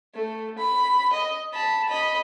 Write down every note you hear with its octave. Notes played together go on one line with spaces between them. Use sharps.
A3
B5
D#5
A5 B5
D#5 B5